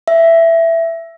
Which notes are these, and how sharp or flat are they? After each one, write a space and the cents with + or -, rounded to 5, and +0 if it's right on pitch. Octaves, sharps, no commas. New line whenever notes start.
E5 +10